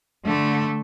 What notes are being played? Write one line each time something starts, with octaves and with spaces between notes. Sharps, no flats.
D3 A3